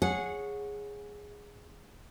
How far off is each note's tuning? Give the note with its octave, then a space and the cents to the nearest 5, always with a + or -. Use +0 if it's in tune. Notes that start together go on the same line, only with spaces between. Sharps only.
G#4 -5 C#5 +0 F#5 -20